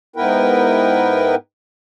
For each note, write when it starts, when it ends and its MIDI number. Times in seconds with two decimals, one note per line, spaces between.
0.16 1.35 44
0.16 1.35 59
0.16 1.35 64
0.16 1.35 70
0.16 1.35 71
0.16 1.35 79